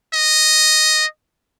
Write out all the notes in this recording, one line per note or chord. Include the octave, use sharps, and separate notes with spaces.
D#5